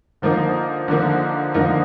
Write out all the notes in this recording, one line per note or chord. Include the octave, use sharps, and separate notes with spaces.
D3 F3 A#3 D#4
D3 F3 A#3 D#4
D3 F3 A#3 D#4